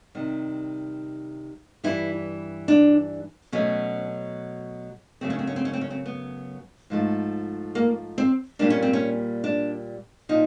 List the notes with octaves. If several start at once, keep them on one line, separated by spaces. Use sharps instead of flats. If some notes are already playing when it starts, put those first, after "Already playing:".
C3 D#3 G3
G2 E3 G3 E4
D4
B2 F#3 A3 C#4
F#2 C#3 F#3 A3 C4
C#4
C4
C#4
C4
C#4
C4
C#4
C4
B3
G#2 F3 A3
A#3
C4
A#2 G3 A#3 D4
C#4
C4
C#4
D4
A#2 F3 D#4